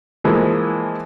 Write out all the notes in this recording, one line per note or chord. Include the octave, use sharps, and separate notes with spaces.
E3 F3 G#3 A#3